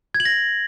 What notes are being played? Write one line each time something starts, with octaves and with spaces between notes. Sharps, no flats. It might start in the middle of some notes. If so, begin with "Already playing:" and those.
G#6
F#7
A#6